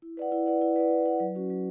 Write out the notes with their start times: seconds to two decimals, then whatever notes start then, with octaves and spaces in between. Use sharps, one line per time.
0.02 E4
0.17 B4 D5 F#5
0.32 E4
0.46 B4 D5 F#5
0.62 E4
0.76 B4 D5 F#5
0.91 E4
1.06 B4 D5 F#5
1.20 F#3
1.35 C#4 F#4
1.50 F#3